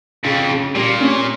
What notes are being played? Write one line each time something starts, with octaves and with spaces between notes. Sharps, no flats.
F2 C#3
C#3
A#2 G3
C#4